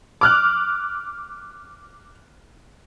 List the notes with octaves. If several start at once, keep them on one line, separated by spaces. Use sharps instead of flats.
D6 F6 F#6